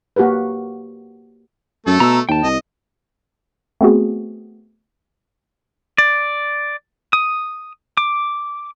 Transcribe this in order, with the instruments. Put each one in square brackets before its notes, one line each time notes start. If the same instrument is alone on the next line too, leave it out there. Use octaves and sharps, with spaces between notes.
[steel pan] A#3 F#4 G4 A#4 B4
[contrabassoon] F#2 [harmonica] A3 A4
[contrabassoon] B2 [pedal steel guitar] A#5 E6
[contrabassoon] D#2 [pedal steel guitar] G5 A5
[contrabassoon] C2 [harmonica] D#5
[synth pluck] A3 B3 C4 F#4 G#4
[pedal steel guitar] D5
D#6
D6